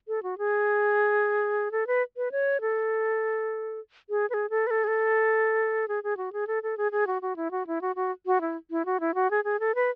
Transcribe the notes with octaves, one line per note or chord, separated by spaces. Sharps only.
A4
F#4
G#4
A4
B4
B4
C#5
A4
G#4
B4
G#4
A4
B4
A4
G#4
A4
G#4
G#4
F#4
G#4
A4
A4
G#4
G#4
F#4
F#4
E4
F#4
E4
F#4
F#4
F#4
E4
E4
F#4
E4
F#4
G#4
G#4
A4
B4